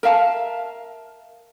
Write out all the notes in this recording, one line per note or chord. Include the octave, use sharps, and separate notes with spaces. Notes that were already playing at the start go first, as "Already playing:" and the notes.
A#4 E5 F5 A5